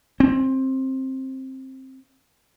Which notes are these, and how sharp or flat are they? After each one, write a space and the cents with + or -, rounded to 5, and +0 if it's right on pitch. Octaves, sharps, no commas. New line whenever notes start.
C4 +15